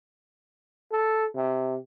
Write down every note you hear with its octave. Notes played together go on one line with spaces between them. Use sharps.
A4
C3